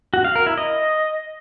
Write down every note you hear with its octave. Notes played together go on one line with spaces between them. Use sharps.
F#4
F5
A#4
E4
D#5